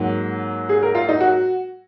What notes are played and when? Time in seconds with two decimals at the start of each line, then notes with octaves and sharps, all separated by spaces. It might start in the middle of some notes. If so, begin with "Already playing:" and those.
Already playing: G#2 F#3 A#3
0.69 G#4
0.83 A#4
0.95 F4
1.09 D#4
1.21 F#4